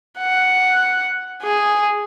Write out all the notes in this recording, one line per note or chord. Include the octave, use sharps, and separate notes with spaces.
F#5
G#4